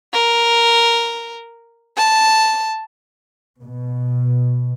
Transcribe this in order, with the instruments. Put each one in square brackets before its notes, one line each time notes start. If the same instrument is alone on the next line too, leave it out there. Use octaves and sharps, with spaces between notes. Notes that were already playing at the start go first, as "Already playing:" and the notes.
[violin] A#4
A5
[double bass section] B2